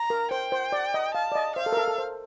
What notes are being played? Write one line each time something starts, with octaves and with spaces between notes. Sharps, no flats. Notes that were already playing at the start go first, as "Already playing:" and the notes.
Already playing: A#5
A#4
C5 G5
C5
D5
D#5
F5 A5
D5
D#5
C5 F5
A4
A#4
A4
A4
C5